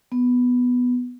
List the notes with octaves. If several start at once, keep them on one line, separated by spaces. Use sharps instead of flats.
B3